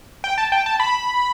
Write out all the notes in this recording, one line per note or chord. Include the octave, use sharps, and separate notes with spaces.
G5
A5
G5
A5
B5